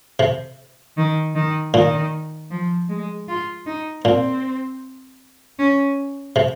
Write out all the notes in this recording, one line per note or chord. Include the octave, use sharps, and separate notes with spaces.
C3
D#3
D#3
A#2 D#3
F3
G#3
F4
D#4
A#2 C4
C#4
C3